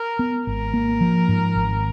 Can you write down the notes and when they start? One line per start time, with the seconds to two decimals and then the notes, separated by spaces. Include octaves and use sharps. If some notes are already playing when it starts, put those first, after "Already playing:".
Already playing: A#4
0.19 B3
0.47 G#1 A#4
0.74 A#3
1.01 F3
1.28 G#2
1.55 G#1